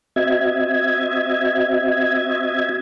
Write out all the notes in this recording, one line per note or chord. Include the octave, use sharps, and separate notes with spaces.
C4 F#4 D#5 E5 G#6